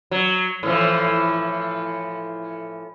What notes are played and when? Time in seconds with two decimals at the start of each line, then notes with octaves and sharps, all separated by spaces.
0.11 F#3
0.63 A2 E3 F3